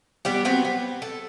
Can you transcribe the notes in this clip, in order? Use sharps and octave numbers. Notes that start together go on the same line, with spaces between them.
G3 B3 G4
F#3 B3 C4
B3
A4